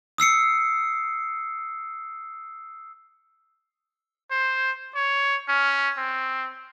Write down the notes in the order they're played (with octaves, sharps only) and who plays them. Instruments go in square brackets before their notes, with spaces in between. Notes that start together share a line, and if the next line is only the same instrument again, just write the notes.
[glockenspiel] D#6 E6 C7 C#7
[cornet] C5
C#5
C#4
C4